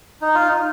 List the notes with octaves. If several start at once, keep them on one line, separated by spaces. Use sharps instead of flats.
D#4
F4
D#4